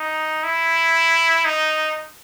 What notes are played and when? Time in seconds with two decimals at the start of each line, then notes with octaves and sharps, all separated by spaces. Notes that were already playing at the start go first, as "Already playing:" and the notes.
Already playing: D#4
0.44 E4
1.45 D#4